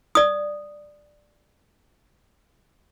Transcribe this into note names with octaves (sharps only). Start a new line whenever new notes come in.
D5 D#6